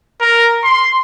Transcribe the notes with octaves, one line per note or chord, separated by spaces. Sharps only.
A#4
C6